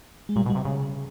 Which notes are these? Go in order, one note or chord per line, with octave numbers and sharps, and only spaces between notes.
G#3
A#2 G3
B2
G3
C3
C#3